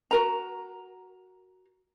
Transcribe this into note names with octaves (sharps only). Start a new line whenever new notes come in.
F#4 A#4 A#5